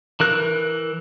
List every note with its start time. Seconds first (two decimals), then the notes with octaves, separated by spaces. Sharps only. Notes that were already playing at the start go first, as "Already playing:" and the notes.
0.20 E3 A#4 F#6